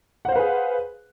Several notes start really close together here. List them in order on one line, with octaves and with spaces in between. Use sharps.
F#5 C5 F5 B4 G#4